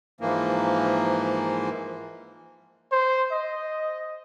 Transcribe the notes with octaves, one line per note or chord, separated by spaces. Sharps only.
G#2 E3 F3 A#3
C5
D#5